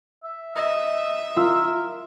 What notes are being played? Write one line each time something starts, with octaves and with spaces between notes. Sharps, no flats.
E5
D#5 E5
F4 A#4 E6